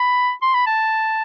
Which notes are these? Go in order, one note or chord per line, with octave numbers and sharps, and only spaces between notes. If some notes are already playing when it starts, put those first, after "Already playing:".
Already playing: B5
C6
B5
A5